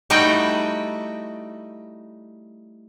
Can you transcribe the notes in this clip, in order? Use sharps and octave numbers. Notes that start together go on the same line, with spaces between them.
G3 A3 D#4 E4 F#4 G5